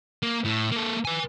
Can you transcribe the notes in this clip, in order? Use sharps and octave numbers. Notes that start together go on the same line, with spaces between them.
A#3
A2
A#3 A4
B4 G#5